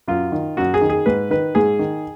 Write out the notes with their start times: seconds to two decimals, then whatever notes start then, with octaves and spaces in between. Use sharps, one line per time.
0.08 F#2 F4
0.32 D#3
0.57 F#2 F#4
0.74 G#4
0.81 D#3
0.89 G#4
1.06 G#2 B4
1.30 D#3 B4
1.55 G#2 G#4
1.79 D#3